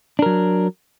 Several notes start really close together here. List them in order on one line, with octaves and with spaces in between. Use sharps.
D4 A#4 F#3